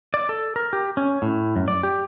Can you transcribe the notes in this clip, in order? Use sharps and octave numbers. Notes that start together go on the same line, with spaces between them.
D5
A4
A#4
G4
C#4
A2
F#2
D5
G4